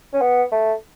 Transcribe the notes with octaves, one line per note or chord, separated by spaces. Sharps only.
C#4
B3
A3